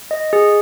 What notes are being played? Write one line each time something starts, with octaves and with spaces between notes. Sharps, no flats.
D#5
G#4